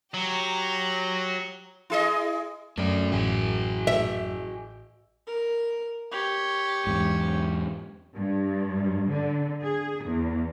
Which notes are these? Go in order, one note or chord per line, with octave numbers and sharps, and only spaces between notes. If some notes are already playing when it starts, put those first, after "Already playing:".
F#3 G4 A#5
E4 G#4 D#5
F#2 A3 D5
A1 F#4 G#4
E5
A#4
G4 C#5
E2 G#2
G2
D3
G#4
E2